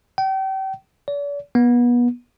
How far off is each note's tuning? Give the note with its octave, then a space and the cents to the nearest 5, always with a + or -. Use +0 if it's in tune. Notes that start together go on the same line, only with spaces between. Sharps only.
G5 -35
D5 -45
B3 -30